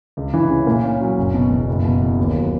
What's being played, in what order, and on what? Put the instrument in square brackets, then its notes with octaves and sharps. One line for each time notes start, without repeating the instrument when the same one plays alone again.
[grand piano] C#2
E3
C#3
A#2
C#4
F#3
F#1
B2
E2
F#1
B2
E2
D#2
F#3